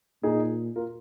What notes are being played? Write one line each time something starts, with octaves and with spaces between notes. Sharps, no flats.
A#2 D#4 G#4
F4 A#4